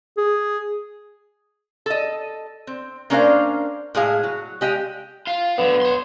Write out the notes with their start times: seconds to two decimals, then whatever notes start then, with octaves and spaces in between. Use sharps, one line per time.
0.17 G#4
1.86 A4 D#5
2.67 C4
3.10 A#3 C#4 D4 A#4 C5 F5
3.95 A2 G#3 G#4 F5
4.24 F#3
4.61 G#3 G4 D#5 F5 G5
5.27 F4 F5
5.58 D3 F#3 B3
5.82 C#5 C6